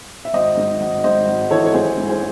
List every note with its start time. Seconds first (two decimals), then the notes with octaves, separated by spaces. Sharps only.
0.25 E5
0.33 G#1 C5 D#5
0.57 G#2
0.80 G#1
1.04 G#2 C5 D#5
1.27 G#1
1.51 E3 A4 C#5
1.65 C#5
1.73 A1 G#4 C5
1.98 G#2
2.09 G#4 C5